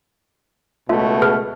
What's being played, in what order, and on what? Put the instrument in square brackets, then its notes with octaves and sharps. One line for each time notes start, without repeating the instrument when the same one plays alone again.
[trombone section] C#2 B2 A3 [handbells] F4 E5
[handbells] G#4 B4 F6